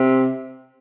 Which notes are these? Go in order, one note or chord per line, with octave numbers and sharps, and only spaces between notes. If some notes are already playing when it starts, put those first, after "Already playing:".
Already playing: C3